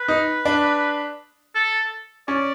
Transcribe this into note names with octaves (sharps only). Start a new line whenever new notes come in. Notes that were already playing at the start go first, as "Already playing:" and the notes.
Already playing: B4
D#4
D4
A4
C#4 D5